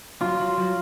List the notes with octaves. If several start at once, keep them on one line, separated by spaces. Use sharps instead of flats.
F#3 F4
F#3
F#3